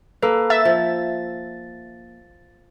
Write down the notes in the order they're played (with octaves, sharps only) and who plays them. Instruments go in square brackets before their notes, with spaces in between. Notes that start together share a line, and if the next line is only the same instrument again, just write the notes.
[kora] A#3 [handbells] A4 B4
[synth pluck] E5 [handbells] A6
[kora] F3